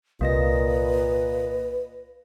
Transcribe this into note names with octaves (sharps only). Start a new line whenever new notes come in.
C2 A#2 A#3 B4 D#5 A#6